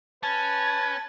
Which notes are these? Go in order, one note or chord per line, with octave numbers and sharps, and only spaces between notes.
C#4 B4 A5 G#6